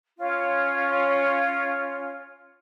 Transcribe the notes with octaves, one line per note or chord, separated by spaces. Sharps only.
C#4 F4 C#5